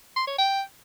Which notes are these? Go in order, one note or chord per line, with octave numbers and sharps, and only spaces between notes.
C6
C#5
G5